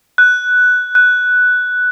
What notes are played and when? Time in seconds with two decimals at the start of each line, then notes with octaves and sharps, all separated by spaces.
0.18 F#6
0.95 F#6